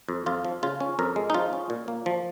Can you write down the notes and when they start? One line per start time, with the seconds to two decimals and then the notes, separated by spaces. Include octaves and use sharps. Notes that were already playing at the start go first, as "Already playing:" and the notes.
0.09 F2
0.26 F2 F4
0.45 F3
0.63 C#3 F4
0.80 C#4
0.99 F2 A#4
1.16 G#3
1.30 D#4
1.34 F3 F4
1.53 C#4
1.70 A#2
1.88 A#3
2.06 F3